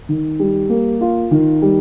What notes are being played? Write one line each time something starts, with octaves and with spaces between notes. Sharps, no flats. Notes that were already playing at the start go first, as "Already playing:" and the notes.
D#3
G3
A#3
F4
D#3
G3